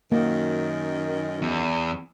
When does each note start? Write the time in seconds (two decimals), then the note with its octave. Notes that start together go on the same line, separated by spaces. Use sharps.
0.12 F#2 D#3 A#3
1.42 E2